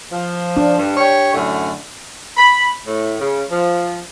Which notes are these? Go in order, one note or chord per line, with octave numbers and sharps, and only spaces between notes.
F3
D4
G2
G4 C#5
F#2 A2 D3
B5
A2
C#3
F3